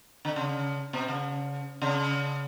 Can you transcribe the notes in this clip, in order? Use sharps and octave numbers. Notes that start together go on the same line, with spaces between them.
D3
C#3
B2
C#3
C#3